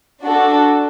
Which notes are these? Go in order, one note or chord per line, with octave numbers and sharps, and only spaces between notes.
D4 F#4 A4